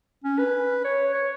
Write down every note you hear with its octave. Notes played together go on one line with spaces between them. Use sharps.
C#4
B4
C#5
C#5